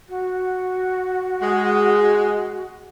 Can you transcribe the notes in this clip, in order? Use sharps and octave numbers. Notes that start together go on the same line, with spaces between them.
F#4
G#3